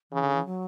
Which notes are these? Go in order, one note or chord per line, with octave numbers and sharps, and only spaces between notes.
C#3 E3
D3
E3
F#3